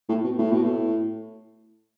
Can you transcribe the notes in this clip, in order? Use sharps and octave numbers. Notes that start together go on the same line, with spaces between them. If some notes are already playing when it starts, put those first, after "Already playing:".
A2
B2
A2
B2
A2